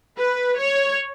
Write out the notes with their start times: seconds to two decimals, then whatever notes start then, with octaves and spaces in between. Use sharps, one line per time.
0.17 B4
0.58 C#5